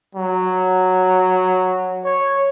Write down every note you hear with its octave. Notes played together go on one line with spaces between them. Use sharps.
F#3
C#5